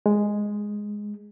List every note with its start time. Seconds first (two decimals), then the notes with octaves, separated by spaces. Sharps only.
0.06 G#3